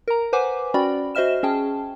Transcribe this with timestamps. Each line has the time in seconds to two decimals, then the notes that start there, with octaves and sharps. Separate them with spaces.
0.08 A#4 A#5
0.33 B4 C5 F#5 G#5 D6
0.74 C#4 F#4 D5 G5 B5
1.15 F#4 C5 D#5 E5 F6 E7
1.43 C#4 G#4 G5 A5